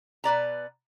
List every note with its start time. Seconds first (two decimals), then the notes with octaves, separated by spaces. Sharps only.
0.24 B2 B4 D5 A#5